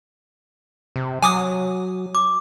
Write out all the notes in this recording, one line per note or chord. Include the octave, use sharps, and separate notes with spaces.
C3
F#3 G#5 D6 D#6
D6